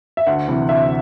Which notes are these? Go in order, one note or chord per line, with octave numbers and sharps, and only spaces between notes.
E5
D2 F#5
C3 E3
D2 E5